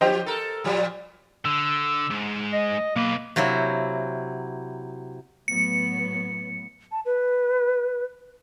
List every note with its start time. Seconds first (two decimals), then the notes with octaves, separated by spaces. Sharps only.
0.01 F3 G4 C5 D#5 G5
0.26 A4 A#4
0.64 A#2 F3 G3
1.45 D3 E6
2.10 G#2
2.53 D#5
2.96 B1 A#3 B4
3.36 C3 F#3 A#3 E4
5.48 A2 F#3 B3 C#7
6.92 A5
7.05 B4